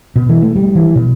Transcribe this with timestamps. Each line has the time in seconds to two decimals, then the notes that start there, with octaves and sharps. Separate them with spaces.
0.16 B2
0.29 E3
0.43 A3
0.56 G3
0.75 E3
0.96 B2